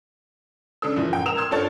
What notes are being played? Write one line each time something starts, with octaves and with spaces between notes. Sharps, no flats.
C#3 D4 A4 E6
F#1 E3 F3
A2 G5
A#4 E6 E7 F7
C6 E6 F6 G#6
G2 F4 A4 C#5 A5 A6